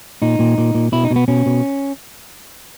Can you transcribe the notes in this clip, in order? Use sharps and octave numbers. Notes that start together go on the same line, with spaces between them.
A#2 D#4
A#2
A#2
A#2
B2 E4
D#4
B2
B3
B2 C#4
B2